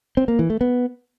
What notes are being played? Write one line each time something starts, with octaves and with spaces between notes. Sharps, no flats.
C4
A#3
E3
A3
B3